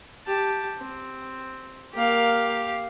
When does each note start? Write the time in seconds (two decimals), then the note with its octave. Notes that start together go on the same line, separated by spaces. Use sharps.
0.27 G4 A5
0.78 C4
1.94 A#3 G4 A#4 F5